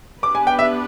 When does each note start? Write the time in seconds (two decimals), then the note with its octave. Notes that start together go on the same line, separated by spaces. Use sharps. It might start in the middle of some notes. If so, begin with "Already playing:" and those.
0.23 B3 D4 G4 B4 D6
0.35 G#5
0.47 G5
0.59 E5